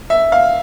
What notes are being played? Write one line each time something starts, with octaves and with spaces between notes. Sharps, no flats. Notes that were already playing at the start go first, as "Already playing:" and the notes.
E5
F5